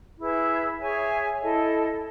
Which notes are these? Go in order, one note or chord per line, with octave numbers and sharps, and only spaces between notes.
E4 G#4 B4 E5
G#4 C#5 E5 G#5
E4 A4 D#5